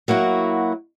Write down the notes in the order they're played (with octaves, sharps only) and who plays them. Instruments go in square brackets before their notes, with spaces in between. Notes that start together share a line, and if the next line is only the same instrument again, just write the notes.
[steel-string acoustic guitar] F#3 A#3 E4 F#4